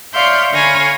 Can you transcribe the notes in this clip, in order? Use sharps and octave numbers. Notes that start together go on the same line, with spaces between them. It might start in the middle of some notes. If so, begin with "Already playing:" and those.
C#5 D5 E5 F5 C6 G6
D3 C#5 F5 G#5 B5 A#6